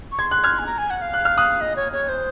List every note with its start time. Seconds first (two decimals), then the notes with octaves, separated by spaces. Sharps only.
0.12 C#6
0.19 C6 G#6
0.31 F#6
0.44 F6 G#6
0.59 G#5
0.66 A#5
0.78 G#5
0.90 F#5
1.02 F5
1.14 F#6
1.25 F6
1.38 D#6 F#6
1.61 D#5
1.76 C#5
1.92 C#5
2.09 C5